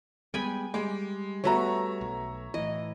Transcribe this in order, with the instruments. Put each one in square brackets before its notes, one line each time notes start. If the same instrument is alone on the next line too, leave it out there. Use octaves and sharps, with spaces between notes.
[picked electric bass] G3 G#3 B3 [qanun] G5 G#5 B5
[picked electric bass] G3 [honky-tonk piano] G#3 [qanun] D6
[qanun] A3 B3 F#4 [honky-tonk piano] C#5 E5 A#5
[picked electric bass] B1
[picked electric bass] A2 E3 [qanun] D#5